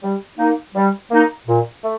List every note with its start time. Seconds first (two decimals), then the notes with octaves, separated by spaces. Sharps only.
0.02 G3
0.38 A#3 D#4
0.74 G3
1.11 A#3 D#4
1.47 A#2
1.83 A3